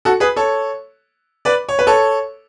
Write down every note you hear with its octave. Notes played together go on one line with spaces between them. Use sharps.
F#4 A4
G#4 B4
A4 C#5
B4 D5
C#5
B4
A4 C#5